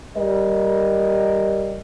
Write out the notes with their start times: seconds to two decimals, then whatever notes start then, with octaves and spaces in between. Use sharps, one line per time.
0.17 G3 A#4 D#5